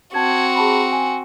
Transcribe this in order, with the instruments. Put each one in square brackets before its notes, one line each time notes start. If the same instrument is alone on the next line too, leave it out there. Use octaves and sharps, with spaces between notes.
[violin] C4 F#4 [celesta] A5 G#6
[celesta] G#4 A5 B5
G#5